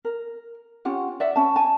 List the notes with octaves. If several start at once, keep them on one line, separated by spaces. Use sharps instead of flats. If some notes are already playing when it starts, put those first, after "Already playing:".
A#4
C#4 F4 G4 F#5
D5 E5 F#5
C#4 A5
G#5 A5